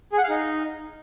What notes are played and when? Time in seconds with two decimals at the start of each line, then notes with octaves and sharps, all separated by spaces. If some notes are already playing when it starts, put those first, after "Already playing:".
0.12 G#4
0.18 F#5
0.24 F5
0.29 D#4